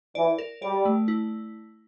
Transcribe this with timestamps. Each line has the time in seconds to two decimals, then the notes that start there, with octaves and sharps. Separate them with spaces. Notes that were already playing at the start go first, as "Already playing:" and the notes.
0.15 E3 D5
0.38 A#4
0.62 G3 D5
0.85 A3
1.08 E4